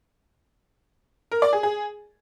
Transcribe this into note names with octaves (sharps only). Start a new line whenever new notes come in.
A#4
D5
G#4
G#4